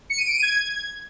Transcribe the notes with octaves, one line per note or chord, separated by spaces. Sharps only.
C#7
D#7
D7
D#7
G#6